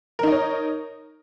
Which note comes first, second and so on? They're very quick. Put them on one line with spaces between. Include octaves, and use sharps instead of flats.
A#4 D#4 D#5 C#5